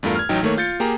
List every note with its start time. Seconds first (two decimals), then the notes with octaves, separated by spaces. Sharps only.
0.03 E2 G2 A3 F4 A#4
0.16 F6 G#6
0.29 A1 F#3 D#4 G5
0.43 D#3 A3 A#3 C#5
0.57 F4 G6 A6 C#7
0.80 A#3 G4 G#4 A#5